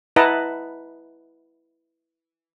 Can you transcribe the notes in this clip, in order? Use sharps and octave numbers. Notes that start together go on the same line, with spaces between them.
E4 B4 D#5 F#5 A5 A#5